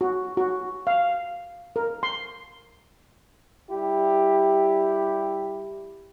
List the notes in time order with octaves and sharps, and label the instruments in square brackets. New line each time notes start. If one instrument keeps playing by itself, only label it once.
[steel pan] F#4
F#4
F5
A#4
C6
[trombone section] G3 E4 G4